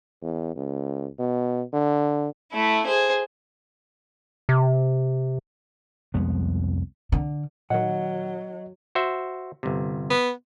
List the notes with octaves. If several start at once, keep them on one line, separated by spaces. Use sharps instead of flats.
E2
C#2
B2
D3
A3 E4
G#4 C5
C3
C2 F2 G#3 B3
D3
A#2 D#3 F#3 D#5 F#5
F#4 C5 E5
G1 C3
B3